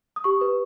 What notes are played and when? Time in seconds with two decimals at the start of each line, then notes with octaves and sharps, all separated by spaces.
0.16 D#6
0.24 G4 C#6
0.41 B4